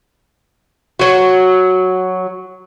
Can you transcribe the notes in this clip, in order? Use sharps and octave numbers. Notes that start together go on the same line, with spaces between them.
F#3 F#4